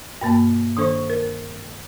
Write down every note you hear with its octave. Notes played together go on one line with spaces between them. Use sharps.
G2 B2 A#3 A5
D#3 D4 A4 C5 C#6
A#4